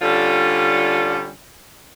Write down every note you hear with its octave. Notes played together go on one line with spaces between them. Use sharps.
D3 G3 C#4 F4 A4